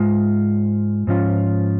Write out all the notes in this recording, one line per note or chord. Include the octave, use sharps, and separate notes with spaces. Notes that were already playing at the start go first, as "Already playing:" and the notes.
Already playing: G#2 G#3 F4
G#2 F3 C#4 F4